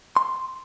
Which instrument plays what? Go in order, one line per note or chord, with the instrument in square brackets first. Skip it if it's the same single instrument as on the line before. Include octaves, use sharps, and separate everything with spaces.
[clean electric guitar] C6